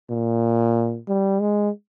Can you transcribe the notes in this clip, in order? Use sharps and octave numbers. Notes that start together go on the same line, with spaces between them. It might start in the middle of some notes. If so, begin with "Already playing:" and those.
A#2
G3
G#3